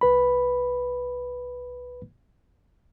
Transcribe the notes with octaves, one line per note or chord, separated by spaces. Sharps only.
C2 B4 B5